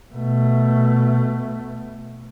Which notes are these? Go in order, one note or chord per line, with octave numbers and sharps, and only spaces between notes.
B2 A3